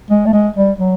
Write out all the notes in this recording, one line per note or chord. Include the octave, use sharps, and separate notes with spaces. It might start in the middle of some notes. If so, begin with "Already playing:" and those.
G#3
A3
G#3
G3
F#3